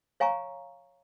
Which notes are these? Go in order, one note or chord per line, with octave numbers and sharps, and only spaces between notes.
C#5 F5 G#5 A#5 C#6